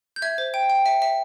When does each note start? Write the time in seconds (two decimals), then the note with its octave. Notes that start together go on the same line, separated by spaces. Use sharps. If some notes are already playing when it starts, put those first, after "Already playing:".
0.16 G6
0.22 E5 G#6
0.38 C5
0.54 G5
0.70 G5
0.86 E5
1.02 E5